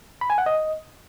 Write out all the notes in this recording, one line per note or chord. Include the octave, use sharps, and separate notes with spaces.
B5
G#5
F#5
D#5